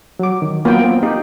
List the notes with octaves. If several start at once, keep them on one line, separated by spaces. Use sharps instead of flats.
F#3 D6
D#3
F#3 A#3 B3 F4 G5
B3 C4 F4
D#4 G4